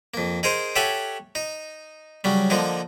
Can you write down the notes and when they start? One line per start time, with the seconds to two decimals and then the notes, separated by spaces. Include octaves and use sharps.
0.14 F2 A#3
0.43 D#4 G#4 A#4 C5
0.76 G4 A4 C#5 E5 F#5 G#5
1.35 D#4
2.24 C#3 F#3 G3
2.50 D3 F3 A#3 D#4